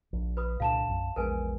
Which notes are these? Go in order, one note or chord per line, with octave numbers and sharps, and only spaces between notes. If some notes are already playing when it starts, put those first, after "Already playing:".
A#1
B4 B5 D#6
C2 A#2 D3 F5 A5 E7
B1 F#2
A#1 E2 G#3 A#4 B4 G#5